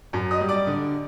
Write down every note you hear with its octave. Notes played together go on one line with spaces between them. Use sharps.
F#2
D#5 D#6
G3
D5 D6
D3